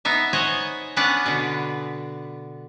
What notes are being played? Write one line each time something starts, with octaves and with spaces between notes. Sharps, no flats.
B3 D#4 E5
C5 C#5 D#5 F#5 G#5
B3 C#4 D4 B4 D5 F#5
B2 D3